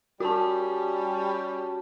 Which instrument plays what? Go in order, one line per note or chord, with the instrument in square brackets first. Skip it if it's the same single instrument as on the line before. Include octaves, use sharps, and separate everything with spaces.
[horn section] G3 C#4 [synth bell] F#4 A5